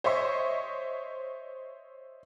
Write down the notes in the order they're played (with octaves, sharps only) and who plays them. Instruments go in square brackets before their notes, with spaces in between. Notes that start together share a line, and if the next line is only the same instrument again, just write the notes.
[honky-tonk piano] C5 C#5 D#5 E5 C6 C#6